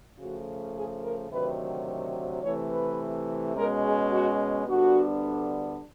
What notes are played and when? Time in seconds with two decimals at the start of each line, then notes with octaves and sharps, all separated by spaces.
0.19 C#3 F3 A3 F#4
0.74 G#4
1.03 A#4
1.31 D2 C3 D#3 F#3 A3 B4
2.43 C3 E3 A3 C#5
2.72 B4
3.56 B2 G#3 C#4 A#4
3.84 G#4
4.12 F#4
4.67 D2 D3 G3 B3 D4 F#4